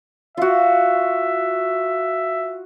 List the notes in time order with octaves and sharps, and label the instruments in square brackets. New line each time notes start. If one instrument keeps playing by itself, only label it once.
[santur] F4 F#4 [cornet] E5